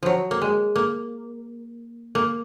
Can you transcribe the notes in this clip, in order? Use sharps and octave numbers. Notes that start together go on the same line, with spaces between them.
F3 F#3
A#3
G#3
A#3
A#3